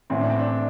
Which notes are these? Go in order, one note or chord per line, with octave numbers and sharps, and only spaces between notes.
A1 A2 E3 C4
D4
C4
D4